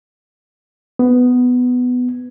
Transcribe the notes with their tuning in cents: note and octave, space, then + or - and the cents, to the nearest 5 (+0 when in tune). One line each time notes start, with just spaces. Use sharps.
B3 +10